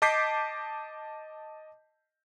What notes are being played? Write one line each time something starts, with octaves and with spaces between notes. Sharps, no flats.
D#5 A5 D6 G6 B6 C7